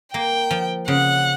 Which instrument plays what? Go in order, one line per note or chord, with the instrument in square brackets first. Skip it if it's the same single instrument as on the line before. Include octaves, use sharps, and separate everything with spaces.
[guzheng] A#3 [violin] G5
[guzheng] F3
[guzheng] C#3 [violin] F#5